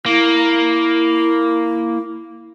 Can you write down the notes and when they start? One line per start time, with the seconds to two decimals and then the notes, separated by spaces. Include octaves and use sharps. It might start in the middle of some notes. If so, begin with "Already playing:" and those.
0.06 A#3 E4